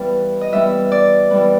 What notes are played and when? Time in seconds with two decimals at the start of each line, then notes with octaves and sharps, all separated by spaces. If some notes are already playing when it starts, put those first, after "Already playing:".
Already playing: E3 G3 B3 F5
0.41 D#5
0.52 E3 G3 B3 E5
0.92 D5
1.31 E3 G3 B3